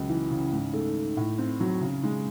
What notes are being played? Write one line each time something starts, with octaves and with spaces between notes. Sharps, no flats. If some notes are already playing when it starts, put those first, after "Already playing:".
Already playing: C#2 F#3
E3
C#3
G#2
A3
D#3
A2
C4
F#3
C#3
G#3